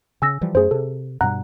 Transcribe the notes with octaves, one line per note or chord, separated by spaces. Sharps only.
C#3 G#5 E6 A#6
E3 F3 G3
F#2 A3 G#4 C5
C3 A4
G2 B2 G3 F#5 A#5 F#6